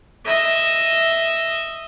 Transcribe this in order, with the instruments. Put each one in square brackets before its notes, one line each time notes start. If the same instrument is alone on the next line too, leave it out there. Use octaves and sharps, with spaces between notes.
[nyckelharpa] D#5 E5